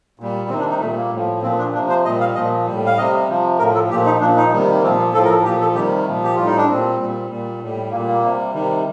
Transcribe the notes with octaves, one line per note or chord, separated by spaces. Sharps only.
A#2 G3
C3 D#3 G3 C4
D4
D#4
A#2 G3 A3
A#3
A2 F3
A#2 F3 C4
D4
C3 F3 D4
C5
A#2 G3 D#5
F5
A#2 F3 D#5
G3
A2
F5
C3 G3 D#5
C3 F3
A2 F3 A#4
A4
A#2 F3 G4
D#4
A#2 F3 D4
D#4
C3 D#3 G3
A#3
A#2 F3 C4
A#3
A2 F3 A4
A#4
A4
A#2 F3 G4
A4
C3 D#3 G3 G4
A#2 F3
G4
A2 G3 F4
D#4
D4
A#2 G3 C4
A#2 G3
A#2 G3
A2 G3
A#2 G3 A#3
A#3
C3 G3
C3 D#3 G3